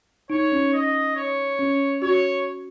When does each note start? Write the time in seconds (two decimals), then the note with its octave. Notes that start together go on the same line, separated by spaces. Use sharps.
0.30 D#4 C#5
0.52 C#4
0.73 D#5
1.16 C#5
1.59 C#4
2.02 F#4 C#5